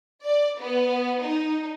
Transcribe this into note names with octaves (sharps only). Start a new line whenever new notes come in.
D5
B3
D#4